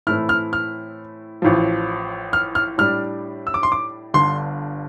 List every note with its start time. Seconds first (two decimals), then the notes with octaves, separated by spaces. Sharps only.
0.07 A2 E3 A3 C4 E4 F6
0.29 F6
0.53 F6
1.42 A1 A2 F3
2.33 F6
2.55 F6
2.78 A2 G3 D4 F6
3.47 E6
3.54 D6
3.63 C6
3.72 D6
4.14 G1 G2 D3 C6